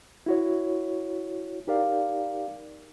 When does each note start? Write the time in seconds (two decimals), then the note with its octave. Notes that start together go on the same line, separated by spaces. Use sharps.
0.26 E4 F#4 C#5
1.67 D#4 G4 A#4 D5 F5